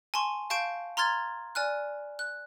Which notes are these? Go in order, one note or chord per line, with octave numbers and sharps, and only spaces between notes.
G#5 A5 C6 C#6
F5 A5 C#6 G6 D7
A#5 C6 F6 G#6 A6
D5 G#5 F6 F#6
F#6